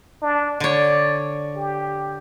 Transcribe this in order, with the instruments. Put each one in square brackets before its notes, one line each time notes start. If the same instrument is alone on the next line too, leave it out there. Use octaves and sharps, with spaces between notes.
[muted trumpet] D4
[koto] D3 C#5 [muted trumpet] D5
[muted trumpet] G4